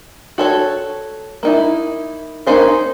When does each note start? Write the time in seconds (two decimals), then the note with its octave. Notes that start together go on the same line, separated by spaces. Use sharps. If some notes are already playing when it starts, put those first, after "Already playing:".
0.38 F#4 A4 C#5
1.43 A#3 D#4 E4
2.47 A#3 C#4 D#4 C5 C#5